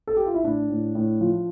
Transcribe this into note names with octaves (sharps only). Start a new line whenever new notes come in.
A4
G4
F4
E4
A2 D4
A2
A2
F3